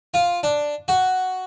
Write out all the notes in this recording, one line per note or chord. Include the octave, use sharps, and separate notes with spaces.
F4
D4
F#4